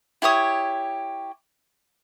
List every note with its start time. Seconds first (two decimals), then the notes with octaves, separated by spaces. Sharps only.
0.22 E4 G4 C#5 D#6